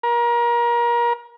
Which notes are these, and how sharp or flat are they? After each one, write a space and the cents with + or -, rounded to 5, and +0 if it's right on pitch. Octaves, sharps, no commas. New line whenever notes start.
A#4 +30